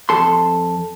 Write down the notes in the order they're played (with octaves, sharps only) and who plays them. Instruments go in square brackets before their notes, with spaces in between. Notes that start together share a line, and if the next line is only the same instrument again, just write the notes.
[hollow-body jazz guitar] F2 A4 C6